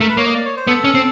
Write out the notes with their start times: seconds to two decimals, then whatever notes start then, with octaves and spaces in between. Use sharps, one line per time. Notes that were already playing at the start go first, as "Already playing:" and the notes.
0.01 A3 A#4
0.09 B4
0.17 A#3 C#5
0.26 D#5
0.34 D5
0.45 C#5
0.57 C5
0.67 B3 A4
0.84 C#4
0.94 C4